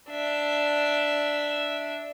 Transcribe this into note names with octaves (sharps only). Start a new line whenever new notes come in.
D4 E5